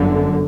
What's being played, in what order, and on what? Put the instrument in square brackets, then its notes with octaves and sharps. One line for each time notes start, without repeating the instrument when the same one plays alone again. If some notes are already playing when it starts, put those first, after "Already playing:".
Already playing: [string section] G1 F#2 D3